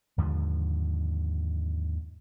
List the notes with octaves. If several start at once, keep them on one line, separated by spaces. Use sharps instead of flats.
D#2 G#2 D3 F3